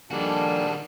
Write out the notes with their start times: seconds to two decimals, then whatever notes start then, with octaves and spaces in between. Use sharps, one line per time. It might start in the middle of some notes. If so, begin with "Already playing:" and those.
0.11 D#3 F3 G3 A#3 D4 F#4 G#4 A4